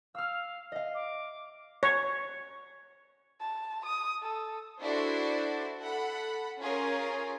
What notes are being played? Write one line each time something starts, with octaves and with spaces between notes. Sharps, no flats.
F5 E6 F6
D#5 F5
D6
C#5
A5
D#6
A4
D4 E4 F#4 A4 C5 D5
A4 F#5 B5
C#4 F4 G#4 A#4